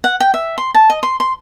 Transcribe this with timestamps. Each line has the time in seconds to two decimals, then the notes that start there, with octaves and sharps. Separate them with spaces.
0.04 F#5
0.20 G5
0.34 E5
0.58 C6
0.74 A5
0.90 D#5
1.03 C6
1.20 C6